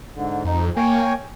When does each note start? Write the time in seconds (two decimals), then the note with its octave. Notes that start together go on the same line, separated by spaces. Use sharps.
0.13 G#2 D3
0.44 F2 D#4
0.77 A#3 C#5 G5 G#5